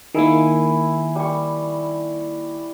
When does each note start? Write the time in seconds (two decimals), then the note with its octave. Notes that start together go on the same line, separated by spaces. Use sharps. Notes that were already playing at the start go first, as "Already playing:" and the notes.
0.14 D#3 A#3 E4 G#4
1.15 G3 C#6